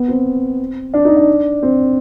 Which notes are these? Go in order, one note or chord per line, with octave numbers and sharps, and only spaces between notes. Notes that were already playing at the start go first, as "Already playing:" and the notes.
Already playing: B3
C4
D4
D#4
D4
C4